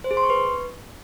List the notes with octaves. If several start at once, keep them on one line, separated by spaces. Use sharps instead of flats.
C5
G#4
C6
C#6
B4